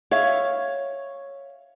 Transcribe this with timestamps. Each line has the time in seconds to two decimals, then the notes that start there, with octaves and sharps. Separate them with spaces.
0.11 C#5 E5 F5